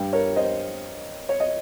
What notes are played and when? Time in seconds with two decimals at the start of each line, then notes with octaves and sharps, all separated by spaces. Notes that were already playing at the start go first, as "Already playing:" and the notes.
Already playing: G2 G3
0.13 A#4 C#5
0.36 C5 D#5
1.29 C#5
1.40 D#5